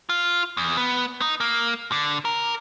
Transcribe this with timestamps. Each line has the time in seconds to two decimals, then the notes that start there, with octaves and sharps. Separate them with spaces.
0.09 F4
0.57 E2
0.77 B3
1.21 D#4
1.40 A#3
1.92 D3
2.25 A#4